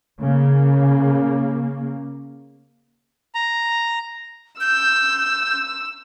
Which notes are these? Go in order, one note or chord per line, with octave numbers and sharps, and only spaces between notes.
C#3 A#3
A#5
E6 G6